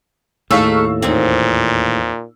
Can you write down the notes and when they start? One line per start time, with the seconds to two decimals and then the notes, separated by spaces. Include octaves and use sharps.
0.51 D#2 A2 A3 D#4 G#4 F5 C#6 E6
1.02 E2 A#2 A#3 C4 D#4